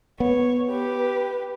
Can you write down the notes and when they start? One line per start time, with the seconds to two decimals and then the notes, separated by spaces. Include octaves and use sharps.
0.20 B3 C#5
0.70 G4 B4